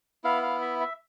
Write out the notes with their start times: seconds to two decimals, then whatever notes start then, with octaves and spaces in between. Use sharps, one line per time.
0.24 B3 E4 F5
0.43 F5
0.61 E5
0.80 E5